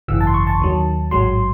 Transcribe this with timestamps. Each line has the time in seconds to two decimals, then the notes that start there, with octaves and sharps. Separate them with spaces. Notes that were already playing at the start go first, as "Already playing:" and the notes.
0.08 G#1 F#2 C#3 E3 E6
0.21 A5
0.27 C6
0.34 C#6
0.47 A5
0.60 D#2 D#3 F#3
1.11 A1 G#2 F#3 C6